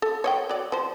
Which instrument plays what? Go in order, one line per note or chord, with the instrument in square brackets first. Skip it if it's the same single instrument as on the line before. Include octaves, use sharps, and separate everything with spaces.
[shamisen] A4
C#5 D#5 G5
F#3 D5
F3 C5